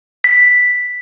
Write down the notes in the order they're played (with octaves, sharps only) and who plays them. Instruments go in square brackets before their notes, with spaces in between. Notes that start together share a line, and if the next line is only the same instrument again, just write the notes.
[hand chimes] B6